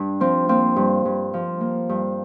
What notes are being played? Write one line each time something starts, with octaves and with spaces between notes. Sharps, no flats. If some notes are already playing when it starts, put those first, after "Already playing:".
Already playing: G2 D4
F3 C4
A#3 C4
G2
G2
F3
A#3
G2